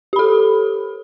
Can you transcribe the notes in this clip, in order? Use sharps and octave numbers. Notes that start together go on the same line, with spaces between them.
G4 A4 B5